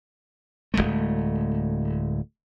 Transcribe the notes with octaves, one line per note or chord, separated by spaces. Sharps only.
D1 C2 G#3 A3